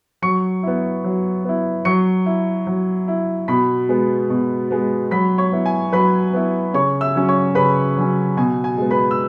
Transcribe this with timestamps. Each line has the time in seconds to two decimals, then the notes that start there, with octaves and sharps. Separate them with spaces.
0.22 F#3 C#6 C#7
0.63 B3 E4
1.04 F#3
1.45 B3 E4
1.85 F#3 C#6 C#7
2.26 E4
2.67 F#3
3.08 E4
3.48 B2 B5 B6
3.89 G#3 B3
4.30 B2
4.71 G#3 B3
5.11 F#3 B5 B6
5.38 C#5 C#6
5.52 B3 E4
5.66 G#5
5.93 F#3 B4 B5
6.33 B3 E4
6.74 C#3 C#5 C#6
7.01 E5 E6
7.15 F#3 C#4
7.29 C#5 C#6
7.55 C#3 B4 B5
7.97 F#3 C#4
8.37 B2 G#5
8.64 G#5
8.78 G#3 B3
8.91 B4 B5
9.11 E6